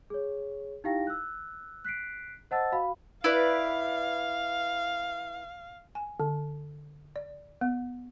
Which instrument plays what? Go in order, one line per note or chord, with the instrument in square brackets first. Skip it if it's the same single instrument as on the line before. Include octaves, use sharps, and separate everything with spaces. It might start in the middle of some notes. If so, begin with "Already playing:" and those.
[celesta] G#4 C#5
D#4 E4 G4 F5 G5 A#6
E6 F#6
F#6 B6 C7 D7
C5 D#5 F#5 A5 E6 A6
F#4 F5 B5
[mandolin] E4 B4 D5 [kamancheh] F5
[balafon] G#5
D3
D5
B3